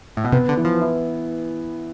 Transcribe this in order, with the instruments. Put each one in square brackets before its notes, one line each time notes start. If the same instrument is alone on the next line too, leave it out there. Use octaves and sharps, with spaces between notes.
[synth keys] A2
B2
[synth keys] C3 [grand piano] B3
[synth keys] D3
[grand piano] E3
[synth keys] F3
[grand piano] E4